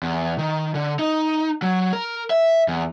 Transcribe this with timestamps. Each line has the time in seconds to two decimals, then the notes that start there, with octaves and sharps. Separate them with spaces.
0.03 E2
0.39 D#3
0.75 D3
0.99 D#4
1.62 F#3
1.93 A#4
2.30 E5
2.68 E2